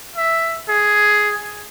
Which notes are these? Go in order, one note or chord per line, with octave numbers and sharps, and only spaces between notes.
E5
G#4